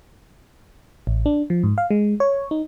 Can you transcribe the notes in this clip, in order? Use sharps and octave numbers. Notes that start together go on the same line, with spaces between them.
A1
D4
F3
G#2
F5
G#3
C#5
D#4